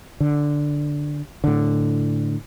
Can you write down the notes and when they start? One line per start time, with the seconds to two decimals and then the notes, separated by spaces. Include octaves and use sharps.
0.20 D3
1.44 A2 D3